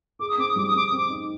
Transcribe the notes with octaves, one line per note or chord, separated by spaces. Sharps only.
G#4 D6
D#6
C4 D6
D#6
G3 D6
D#6
C4 D6
D#6
C4 D6
D#4